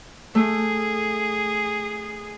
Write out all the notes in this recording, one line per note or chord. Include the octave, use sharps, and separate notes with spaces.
A3 G#4